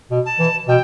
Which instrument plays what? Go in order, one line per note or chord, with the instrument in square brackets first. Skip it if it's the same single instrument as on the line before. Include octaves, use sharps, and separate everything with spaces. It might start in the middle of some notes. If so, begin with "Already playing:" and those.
[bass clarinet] B2
[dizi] A5
[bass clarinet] E3
[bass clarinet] B2 [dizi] G5